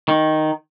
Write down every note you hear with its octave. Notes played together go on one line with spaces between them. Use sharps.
D#3